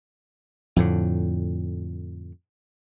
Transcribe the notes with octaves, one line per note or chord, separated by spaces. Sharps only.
F2 A2 D3